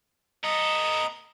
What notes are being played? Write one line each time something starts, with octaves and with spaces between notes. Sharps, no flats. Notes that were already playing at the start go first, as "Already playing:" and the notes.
B3 A4 D#5 A#5